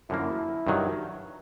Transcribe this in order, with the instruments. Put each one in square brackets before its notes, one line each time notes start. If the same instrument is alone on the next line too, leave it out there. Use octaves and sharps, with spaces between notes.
[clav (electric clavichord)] F#2 D3 F3 A#3 [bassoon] E4
[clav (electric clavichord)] G2 D#3 F#3